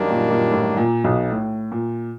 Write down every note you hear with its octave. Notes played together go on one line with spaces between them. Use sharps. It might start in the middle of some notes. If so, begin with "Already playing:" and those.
Already playing: F#2 D#3 G3 A#3 D4
A#2
A#2
A2
A#2
B1 B2
A2
A#2